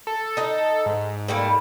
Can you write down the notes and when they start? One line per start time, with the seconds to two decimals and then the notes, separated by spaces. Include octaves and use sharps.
0.07 A4
0.37 D#4 D#5
0.86 G#2
1.28 G3 A3 A#3